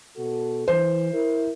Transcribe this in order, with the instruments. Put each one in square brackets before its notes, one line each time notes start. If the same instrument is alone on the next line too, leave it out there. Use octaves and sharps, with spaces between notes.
[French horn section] B2 F#4 A4
[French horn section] E3 [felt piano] C5
[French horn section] E4 A#4